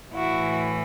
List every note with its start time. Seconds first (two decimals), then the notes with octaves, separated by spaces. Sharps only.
0.14 A2 E3 E4 F#4